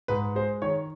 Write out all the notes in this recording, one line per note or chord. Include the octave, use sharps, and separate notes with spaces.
G#2 B4
G#3 C5
D#3 C#5